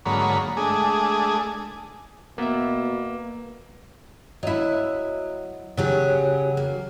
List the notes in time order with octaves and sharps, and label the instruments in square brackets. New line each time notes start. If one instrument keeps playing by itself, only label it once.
[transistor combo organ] G#2 D3 F#3 A#3 C#5 B5
G#3 A3 D4 G#4
[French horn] B2 [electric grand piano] A#3 [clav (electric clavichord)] B3 E5
[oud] F#3 E4 [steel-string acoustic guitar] D#5
[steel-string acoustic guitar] C#3 G4 G#4 [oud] F#3
[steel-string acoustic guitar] A#3